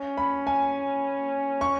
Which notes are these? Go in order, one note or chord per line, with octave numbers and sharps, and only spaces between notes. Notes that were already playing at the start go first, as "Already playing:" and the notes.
Already playing: C#4
B5
G#5
C#6